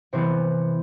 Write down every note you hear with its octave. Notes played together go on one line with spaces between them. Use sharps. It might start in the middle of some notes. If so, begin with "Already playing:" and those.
C3 E3 B3 C5